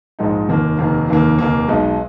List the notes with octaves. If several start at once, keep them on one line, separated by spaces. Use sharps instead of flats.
A#1 G#2 F3 G#3 D#4
F1 D#2 D#3 A#3
F1 D#2 D#3 A#3
F1 D#2 D#3 A#3
F1 D#2 D#3 A#3
B1 B2 G#3 D#4